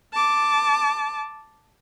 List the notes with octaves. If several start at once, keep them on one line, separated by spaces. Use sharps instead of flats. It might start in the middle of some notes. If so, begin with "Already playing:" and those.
A5 D6